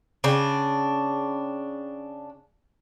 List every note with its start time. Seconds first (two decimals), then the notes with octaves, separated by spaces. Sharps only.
0.24 C#3 D4 G5